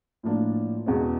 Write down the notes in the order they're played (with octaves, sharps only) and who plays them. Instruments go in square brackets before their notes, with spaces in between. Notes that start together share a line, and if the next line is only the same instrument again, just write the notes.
[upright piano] A2 F3 A#3 D4 F4
E2 B2 G#3 C#4